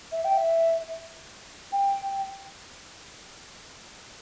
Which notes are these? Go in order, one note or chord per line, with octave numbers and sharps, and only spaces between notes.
E5
G5
E5
G5